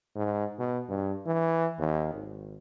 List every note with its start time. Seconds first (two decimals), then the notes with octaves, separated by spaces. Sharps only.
0.16 G#2
0.59 B2
0.89 G2
1.26 E3
1.79 D#2
2.13 G#1